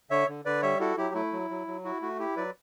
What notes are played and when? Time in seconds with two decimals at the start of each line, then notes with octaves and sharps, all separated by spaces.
0.10 D3 C#5 E5
0.28 D3
0.45 D3 B4 D5
0.62 G3 C#5 E5
0.80 E4 F#4 A4
0.97 F#3 E4 G4
1.14 A3 E4
1.32 F#3
1.50 F#3
1.67 F#3
1.84 E4 F#4
2.02 A3 F#4
2.19 E4 G4
2.36 F#3 B4 D5